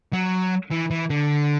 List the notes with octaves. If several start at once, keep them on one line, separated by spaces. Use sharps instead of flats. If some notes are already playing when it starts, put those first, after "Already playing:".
F#3
E3
E3
D3